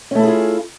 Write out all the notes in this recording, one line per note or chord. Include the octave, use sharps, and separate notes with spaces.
A3 C#4 E4 F4 G#4